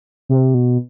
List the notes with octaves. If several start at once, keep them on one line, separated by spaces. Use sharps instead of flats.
C3
B2